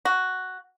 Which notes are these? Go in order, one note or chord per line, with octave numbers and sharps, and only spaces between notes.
F#4